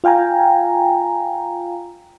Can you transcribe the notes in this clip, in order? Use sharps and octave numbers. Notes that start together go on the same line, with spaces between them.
F4 F5 G5 G#5 A#5